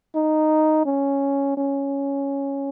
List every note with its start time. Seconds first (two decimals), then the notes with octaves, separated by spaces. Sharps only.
0.15 D#4
0.85 C#4
1.57 C#4